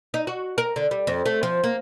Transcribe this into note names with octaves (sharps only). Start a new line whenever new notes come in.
D#4
F#4
A#4
D3
G3
F2
A3
F3
A#3